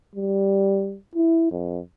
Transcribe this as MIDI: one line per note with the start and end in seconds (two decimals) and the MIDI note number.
0.16 0.97 55
1.15 1.47 64
1.51 1.80 41